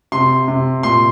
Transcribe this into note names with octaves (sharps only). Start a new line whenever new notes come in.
C3 C6
C3
A#2 C6